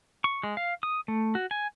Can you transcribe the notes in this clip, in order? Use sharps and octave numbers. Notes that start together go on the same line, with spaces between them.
C#6
G#3
F5
D#6
A3
F#4
G#5